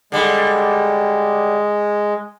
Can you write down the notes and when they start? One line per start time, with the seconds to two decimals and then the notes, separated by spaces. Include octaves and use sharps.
0.12 D3 G3 G#3